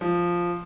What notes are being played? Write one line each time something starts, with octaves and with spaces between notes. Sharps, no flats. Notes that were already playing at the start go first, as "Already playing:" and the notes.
F3